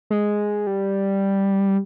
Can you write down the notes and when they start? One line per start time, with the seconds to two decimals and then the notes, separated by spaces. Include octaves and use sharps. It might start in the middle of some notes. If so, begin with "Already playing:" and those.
0.10 G#3
0.67 G3